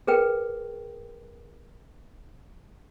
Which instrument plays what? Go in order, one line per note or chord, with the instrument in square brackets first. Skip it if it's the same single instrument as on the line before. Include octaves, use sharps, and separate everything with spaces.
[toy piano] G#4 A#4 B4 G5